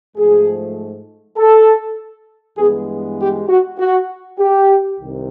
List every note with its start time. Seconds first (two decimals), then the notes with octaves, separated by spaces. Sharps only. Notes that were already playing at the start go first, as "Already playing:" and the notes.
0.16 G#2 F3 A3 G#4
1.37 A4
2.58 G2 E3 G#3 B3 G#4
3.19 G4
3.49 F#4
3.79 F#4
4.39 G4
5.00 C2 C3 D#3